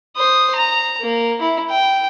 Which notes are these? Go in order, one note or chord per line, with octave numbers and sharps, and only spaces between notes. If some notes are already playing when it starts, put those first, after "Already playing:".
C5 D#6
A#5
A#3
E4
G5